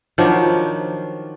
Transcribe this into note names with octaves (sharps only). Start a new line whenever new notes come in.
D#3 F3 F#3 D4